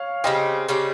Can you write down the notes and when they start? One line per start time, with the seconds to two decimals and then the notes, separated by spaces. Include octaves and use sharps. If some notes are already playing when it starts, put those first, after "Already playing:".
Already playing: C#5 F5
0.24 C#3 G3 C4 D#5 G5
0.68 C#3 G3 C4